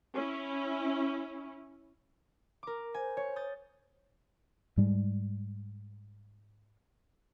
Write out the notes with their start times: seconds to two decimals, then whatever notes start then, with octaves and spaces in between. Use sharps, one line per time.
0.15 C#4 E4
2.63 A#4 D6
2.94 C5 G#5
3.17 C#5
3.36 D#6 G6 A6
4.77 G#2 G3 G#3